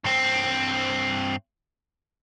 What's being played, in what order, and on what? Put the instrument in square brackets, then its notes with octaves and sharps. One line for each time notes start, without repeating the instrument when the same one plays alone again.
[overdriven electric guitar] G2 C4